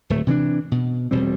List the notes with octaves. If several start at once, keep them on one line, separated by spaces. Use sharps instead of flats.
D1 A3
C3 E3 B3 D4
B2
E1 B2 G3 C4